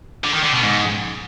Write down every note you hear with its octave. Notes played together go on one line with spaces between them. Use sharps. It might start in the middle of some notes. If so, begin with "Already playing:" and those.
D3
D#3
D3
B2
G#2